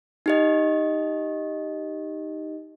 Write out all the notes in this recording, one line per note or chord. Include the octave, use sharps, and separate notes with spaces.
D#4 G4 D#5